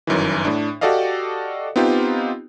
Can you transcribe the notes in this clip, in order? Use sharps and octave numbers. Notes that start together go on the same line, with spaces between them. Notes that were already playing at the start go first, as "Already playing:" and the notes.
G1 F#2 D#3 E3
A2 D4
F#4 G4 A4 D5 D#5 F5
B3 C4 D#4 F4 G4